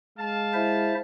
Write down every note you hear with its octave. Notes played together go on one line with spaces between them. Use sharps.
G#3 F5 A5
E4 C5 E5